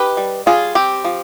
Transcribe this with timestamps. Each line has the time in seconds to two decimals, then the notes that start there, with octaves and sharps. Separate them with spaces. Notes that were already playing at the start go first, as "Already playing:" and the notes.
Already playing: D#4 G4 B4
0.17 G3
0.46 G3 F4 G#4
0.75 C4 G4
1.04 F3